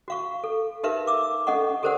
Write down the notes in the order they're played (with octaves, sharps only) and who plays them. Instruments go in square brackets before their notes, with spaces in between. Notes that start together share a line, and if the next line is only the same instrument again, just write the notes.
[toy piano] F#4 F5 C#6
A4
D#4 G4 A#4 B4 E5 F5
D6 E6
C#4 A4 D#5 F#5 C#6
G4 A4 A#4 C5 D5 F#5